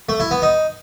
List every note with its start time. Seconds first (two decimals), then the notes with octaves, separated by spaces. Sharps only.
0.09 A3
0.20 E4
0.31 B3
0.42 D#4